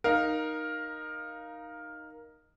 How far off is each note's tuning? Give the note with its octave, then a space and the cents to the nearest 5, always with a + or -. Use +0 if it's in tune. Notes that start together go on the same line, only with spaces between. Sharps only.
D#4 -5 A#4 +10 F5 +0